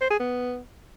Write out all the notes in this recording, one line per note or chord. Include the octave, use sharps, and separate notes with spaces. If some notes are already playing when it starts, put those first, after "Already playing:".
C5
G#4
B3